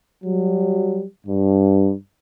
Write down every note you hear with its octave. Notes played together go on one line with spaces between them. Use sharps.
F#3 G3
G2